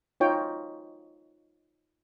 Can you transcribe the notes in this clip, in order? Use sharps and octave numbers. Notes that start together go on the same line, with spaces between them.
D#4 F4 C#5 G5